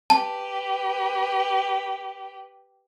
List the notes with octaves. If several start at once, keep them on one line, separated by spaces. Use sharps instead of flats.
G4 B4 A5